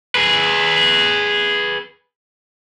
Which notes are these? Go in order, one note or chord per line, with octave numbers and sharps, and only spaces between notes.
G#4 B4